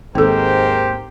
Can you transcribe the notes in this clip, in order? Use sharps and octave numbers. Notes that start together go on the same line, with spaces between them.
G#1 D#2 G#2 C4 G4 A4 A#4 C5